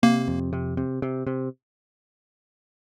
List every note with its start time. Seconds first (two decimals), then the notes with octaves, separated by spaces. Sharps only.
0.03 C3 A#3
0.28 F2
0.53 C3
0.77 C3
1.02 C3
1.27 C3